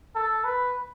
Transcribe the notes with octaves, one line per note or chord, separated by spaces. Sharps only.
A4
B4